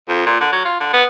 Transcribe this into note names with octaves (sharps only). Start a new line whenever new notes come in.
F2
A#2
D3
F#3
F4
D3
B3